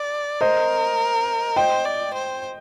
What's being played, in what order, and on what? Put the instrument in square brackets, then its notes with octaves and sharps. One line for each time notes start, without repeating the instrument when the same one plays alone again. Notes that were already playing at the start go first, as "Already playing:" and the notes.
Already playing: [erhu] D5
[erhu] A#4 [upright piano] C5 D#5
[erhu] C5 [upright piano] D#5 G5
[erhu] D5
C5